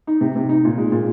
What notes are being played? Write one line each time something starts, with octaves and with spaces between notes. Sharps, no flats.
D#4
C3
C3
D#4
A#2
G#3
A#2